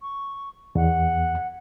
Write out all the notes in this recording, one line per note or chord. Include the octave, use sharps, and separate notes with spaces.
C#6
E2 F#5